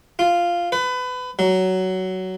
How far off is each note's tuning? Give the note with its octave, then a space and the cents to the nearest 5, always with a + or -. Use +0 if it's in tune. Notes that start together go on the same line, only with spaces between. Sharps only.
F4 -5
B4 +25
F#3 +15